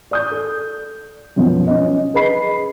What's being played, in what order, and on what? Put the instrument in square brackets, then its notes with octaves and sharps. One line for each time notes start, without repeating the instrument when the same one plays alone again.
[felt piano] D5 D#6 G6
A4
F#2 B2 F3 B3
C#4 D#5
G#4 B4 D#5 B5 C7